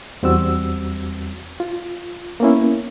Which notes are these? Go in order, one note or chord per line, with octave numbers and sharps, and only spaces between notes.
E2 G3 C4 F#4 E6
F4
A#3 B3 C#4 E4